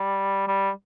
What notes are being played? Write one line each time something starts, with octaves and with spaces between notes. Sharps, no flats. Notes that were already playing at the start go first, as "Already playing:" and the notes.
Already playing: G3
G3